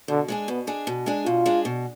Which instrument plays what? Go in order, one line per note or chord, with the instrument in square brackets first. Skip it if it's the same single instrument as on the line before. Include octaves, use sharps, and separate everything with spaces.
[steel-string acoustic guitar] B2 [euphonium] D3
[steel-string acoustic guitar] G#3 D4 G#4
[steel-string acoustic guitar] B2 [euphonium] B3
[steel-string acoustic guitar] G#3 D4 G#4
B2
G#3 D4 G#4
[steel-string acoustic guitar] B2 [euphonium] F4
[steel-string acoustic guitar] G#3 D4 G#4
B2